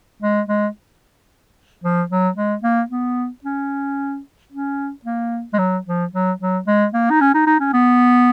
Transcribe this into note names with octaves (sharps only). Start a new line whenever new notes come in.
G#3
G#3
F3
F#3
G#3
A#3
B3
C#4
C#4
A#3
G#3
F#3
F3
F#3
F#3
G#3
A#3
D#4
C#4
D#4
D#4
C#4
B3